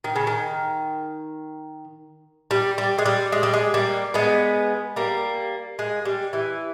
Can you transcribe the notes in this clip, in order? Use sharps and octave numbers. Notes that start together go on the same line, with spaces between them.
D#3
C#3
D#3
G3
G3
G#3
G3
G#3
G3
G#3
G3 A#3
G#3 B3
G3 A#3
G#3
G3
E3